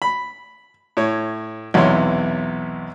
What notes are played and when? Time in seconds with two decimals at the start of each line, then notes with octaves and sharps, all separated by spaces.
0.02 B5
0.97 A2 C#5
1.74 B1 E2 C3 B3 C#5 C6